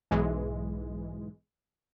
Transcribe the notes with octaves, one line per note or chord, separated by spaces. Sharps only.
B1 G#2 E3 G#3